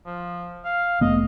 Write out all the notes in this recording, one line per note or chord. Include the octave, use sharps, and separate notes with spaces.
F3
F5
F1 A3 B3 D#5